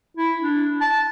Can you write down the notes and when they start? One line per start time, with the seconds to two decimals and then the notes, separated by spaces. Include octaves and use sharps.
0.17 E4
0.41 D4
0.81 A5